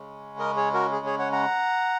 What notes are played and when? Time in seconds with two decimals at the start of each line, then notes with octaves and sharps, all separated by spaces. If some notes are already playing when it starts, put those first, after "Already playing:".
Already playing: C#3 G#3 C#4
0.39 A#4 D#5
0.56 G#4 C#5
0.74 F#4 A#4
0.92 G#4
1.06 G#4 C#5
1.19 C#5 F#5
1.32 F#5 A#5